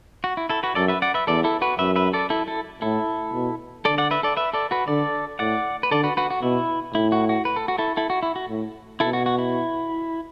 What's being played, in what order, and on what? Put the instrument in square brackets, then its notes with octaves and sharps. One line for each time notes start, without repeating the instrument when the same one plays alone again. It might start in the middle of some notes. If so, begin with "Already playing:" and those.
[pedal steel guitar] F#4
E4
E4 A4
F#4 B4
[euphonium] F#2 [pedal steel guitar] A4 D5
[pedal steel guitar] B4 E5
D5 F#5
B4 E5
[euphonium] E2 [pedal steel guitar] A4 D5
[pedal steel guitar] E4 A4
F#4 B4
[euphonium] F#2 [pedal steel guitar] B4 E5
[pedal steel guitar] B4 E5
A4 D5
E4 A4
E4 A4
[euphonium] A2 [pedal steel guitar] E4 A4
[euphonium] B2
[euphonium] D3 [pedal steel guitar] A4 D5
[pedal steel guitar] D5 F#5
B4 E5
A4 D5
B4 E5
A4 D5
F#4 B4
[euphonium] D3 [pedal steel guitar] A4 D5
[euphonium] A2 [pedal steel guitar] D5 F#5
[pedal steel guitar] B4
[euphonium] D3 [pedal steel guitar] A4 D5
[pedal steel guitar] F#4 B4
F#4 B4
F#4
[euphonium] B2 [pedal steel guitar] E4
[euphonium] A2 [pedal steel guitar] E4
[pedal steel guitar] F#4
F#4
B4
A4
F#4
E4 A4
E4 A4
F#4
E4
F#4
[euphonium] A2
[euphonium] B2 [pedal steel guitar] E4 A4
[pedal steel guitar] F#4
F#4
E4